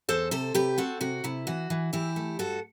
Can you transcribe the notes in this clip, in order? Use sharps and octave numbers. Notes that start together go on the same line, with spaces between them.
E2 A4 C5
C3 A4 C5
C3 G4 B4
C4 F#4 A4
C3 F#4
C3 E4
E3 F#4
E3
E3 E4 G4
A3
G2 F#4 A4